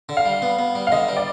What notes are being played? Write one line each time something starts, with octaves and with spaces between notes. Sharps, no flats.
D3
F5
G3
B3
B3
G3
F5
D3 D#5
G3
D5